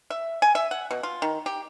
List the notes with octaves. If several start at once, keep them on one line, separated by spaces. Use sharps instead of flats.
E5
G#5
E5
F#5
B2
F4
D#3
G4